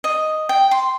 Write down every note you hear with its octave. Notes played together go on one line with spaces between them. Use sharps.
D#5
G5
C6